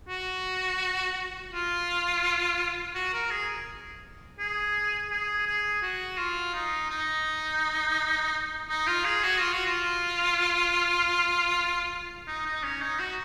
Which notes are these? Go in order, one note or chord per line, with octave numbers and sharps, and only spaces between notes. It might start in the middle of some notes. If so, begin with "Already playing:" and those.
F#4
F4
F#4
A#4
G#4
G#4
G#4
G#4
F#4
F4
D#4
D#4
D#4
F4
G#4
F#4
F4
F#4
F4
D#4
D#4
C#4
D#4
F#4